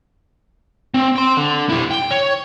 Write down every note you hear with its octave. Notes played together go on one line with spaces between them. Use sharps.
C4
G5 C6
D3
E4 G4
G5
C#5